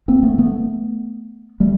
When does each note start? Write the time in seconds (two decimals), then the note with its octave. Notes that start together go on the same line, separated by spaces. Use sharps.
0.08 A#3 C4
0.23 A3 B3
0.38 A3 B3
1.60 G3 A3